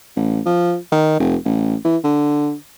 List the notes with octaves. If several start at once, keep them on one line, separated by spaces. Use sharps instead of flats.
A1
F3
D#3
F1
A1
E3
D3